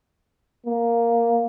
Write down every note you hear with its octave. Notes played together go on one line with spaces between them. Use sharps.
A#3